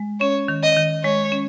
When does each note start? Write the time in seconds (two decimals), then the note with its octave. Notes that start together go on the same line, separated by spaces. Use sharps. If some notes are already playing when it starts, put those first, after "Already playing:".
Already playing: G#3
0.20 C#4 C#5
0.48 D#3
0.63 D#5
0.77 D#3
1.04 G#3 C#5
1.32 C#4